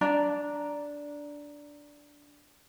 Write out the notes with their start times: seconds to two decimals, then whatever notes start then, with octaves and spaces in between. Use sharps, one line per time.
0.01 D4 D5 A#5